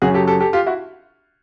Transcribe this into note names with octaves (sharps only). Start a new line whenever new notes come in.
F#2 C#3 F#3 F#4 G#4
G4 A4
G4 A4
G4 A4
F4 G4
E4 F#4